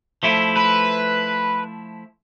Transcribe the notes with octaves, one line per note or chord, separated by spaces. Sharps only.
F3 A3 E4
B4